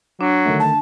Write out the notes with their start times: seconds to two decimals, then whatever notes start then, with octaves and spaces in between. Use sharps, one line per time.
0.21 F#3 D4
0.46 D3 D#3 A3
0.59 A5